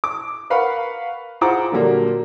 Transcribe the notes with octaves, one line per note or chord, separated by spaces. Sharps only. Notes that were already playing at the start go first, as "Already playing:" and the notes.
D6
A#4 B4 F5 F#5 B5 C#6
F4 G#4 C5 F#5 A#5 D6
A#2 D3 F#3 G3 A#3